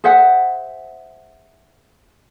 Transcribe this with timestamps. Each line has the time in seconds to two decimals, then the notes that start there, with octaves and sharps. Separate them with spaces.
0.04 G#4 C5 E5 F#5